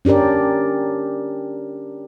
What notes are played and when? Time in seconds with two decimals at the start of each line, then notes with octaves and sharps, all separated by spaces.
0.05 C#4 D4 G4 A#4 D5